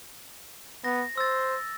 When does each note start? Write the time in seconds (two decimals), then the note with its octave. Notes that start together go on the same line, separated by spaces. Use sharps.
0.84 B3 A#6
1.18 C5 E6 A6